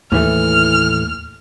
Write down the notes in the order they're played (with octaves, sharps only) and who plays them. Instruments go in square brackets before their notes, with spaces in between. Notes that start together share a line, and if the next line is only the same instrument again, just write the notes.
[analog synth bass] D#2 [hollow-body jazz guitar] A2 E3 A3 [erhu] F6